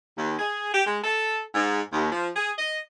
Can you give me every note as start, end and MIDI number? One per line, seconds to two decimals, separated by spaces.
0.17 0.38 39
0.39 0.71 68
0.74 0.82 67
0.87 0.99 56
1.04 1.40 69
1.54 1.81 44
1.93 2.10 39
2.12 2.28 53
2.36 2.51 68
2.58 2.79 75